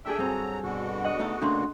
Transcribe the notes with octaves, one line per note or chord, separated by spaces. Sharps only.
D4 G#4 A4 E5 G5 E6
G2 F#3 C4 A#5
B2 D3 F#4
D#5 F#5
A3 D#4 A4
C#3 A3 A#3 D4 C6